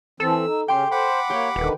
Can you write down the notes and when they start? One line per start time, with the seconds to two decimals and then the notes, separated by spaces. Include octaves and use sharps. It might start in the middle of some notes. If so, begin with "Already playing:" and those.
0.20 E3 C4 A4 E6
0.46 D#4
0.68 C#3 C#4 G4 G5 C6
0.91 C5 F#5 B5 D6
1.30 A#3 G4 C#5
1.56 D#1 D3 D#3 B4